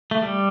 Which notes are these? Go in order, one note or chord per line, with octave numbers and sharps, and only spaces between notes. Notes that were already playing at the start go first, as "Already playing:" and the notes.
A3
G3